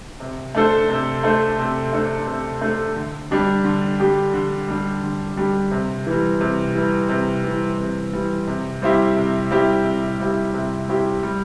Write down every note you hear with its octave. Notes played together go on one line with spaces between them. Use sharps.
C3
A3 D4 A4 C5
C3
A3 D4 A4 C5
C3
A3 D4 A4 C5
C3
A3 D4 A4 C5
D3
G3 D4 G4
D3
G3 D4 G4
D3
G3 D4 G4
D3
G3 D4 G4
C3
E3 G3
C3
E3 G3
C3
E3 G3
C3
E3 G3
C3
G3 C4 E4 G4
C3
G3 C4 E4 G4
C3
G3 C4 E4 G4
C3
G3 C4 E4 G4
G3